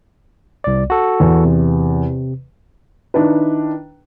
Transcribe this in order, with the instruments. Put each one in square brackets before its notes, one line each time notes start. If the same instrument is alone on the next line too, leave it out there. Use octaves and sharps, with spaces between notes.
[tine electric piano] C2 D5
F#4 A4
[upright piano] E2
[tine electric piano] C3
[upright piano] D#3 D4 E4 B4